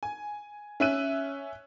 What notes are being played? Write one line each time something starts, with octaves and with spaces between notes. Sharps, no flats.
G#5
C#4 E5 F#6 D#7